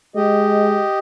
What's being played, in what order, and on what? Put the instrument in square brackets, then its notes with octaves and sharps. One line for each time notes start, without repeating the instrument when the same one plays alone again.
[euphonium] G#3 [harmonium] G4 D#5